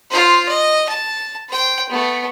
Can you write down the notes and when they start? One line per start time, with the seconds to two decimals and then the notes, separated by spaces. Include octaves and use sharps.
0.10 F4 C5
0.48 D#5
0.89 A5
1.49 C5 G5
1.89 A3 B3